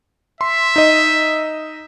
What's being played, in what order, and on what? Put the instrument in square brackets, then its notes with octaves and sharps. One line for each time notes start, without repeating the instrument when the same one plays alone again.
[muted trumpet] E5 [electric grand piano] C6
[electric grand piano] D#4 D#5